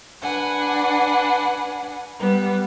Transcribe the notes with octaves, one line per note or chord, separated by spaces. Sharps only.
D4 B4 F#5 G#5
G3 B3